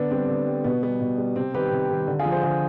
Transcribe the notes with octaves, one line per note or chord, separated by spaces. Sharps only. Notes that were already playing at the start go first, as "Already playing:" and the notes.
Already playing: D3 B3 D4
G3 C4
D3
G3
B2 B3
G3 B3
B2
G3
C3 C4
D#3 G3 G4 B4
C3
D#3 G3
D3
F4 G#4
F3
G#4 C5
D3 G#4 C5